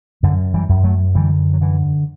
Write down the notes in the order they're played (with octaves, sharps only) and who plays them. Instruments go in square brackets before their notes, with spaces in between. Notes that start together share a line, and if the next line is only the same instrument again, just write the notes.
[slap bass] F#2 D3 F#3
E3 G3
F#2
F#3 A3
D3 E3 G3
F#3
D3 E3